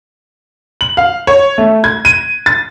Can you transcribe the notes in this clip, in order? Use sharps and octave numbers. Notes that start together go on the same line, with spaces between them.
F#7
F5
C#5
A3
G#6
D#7
A6